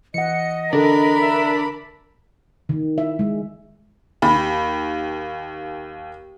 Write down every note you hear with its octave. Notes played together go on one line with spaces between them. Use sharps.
E3 D#5 F#5 C#7
D3 D4 A4 A#4 B5
E5
D#3
E5
G#3
D#2 B5